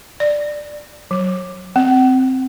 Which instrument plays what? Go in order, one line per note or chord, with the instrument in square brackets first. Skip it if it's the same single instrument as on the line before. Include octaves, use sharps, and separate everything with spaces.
[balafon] D5
F#3
C4